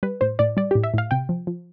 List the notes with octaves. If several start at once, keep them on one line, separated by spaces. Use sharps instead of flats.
G3 B4
A2 C5
A2 D5
G3 D5
A2 G4
E5
A2 F5
C3 G5
F3
F3